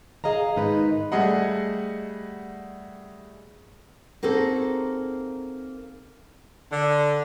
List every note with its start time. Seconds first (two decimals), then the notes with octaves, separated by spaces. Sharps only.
0.24 G#4 D#5 F5 A#5
0.56 G#2 D#3 D#4 B4
1.12 G3 A3 G#4 D#5 F#5
4.23 A#3 C4 D#4 F#4 G#4 A4
6.72 D3